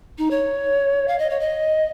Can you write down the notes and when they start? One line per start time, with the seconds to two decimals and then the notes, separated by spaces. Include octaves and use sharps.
0.18 D#4
0.31 C#5
1.08 F5
1.19 D#5
1.30 C#5
1.40 D#5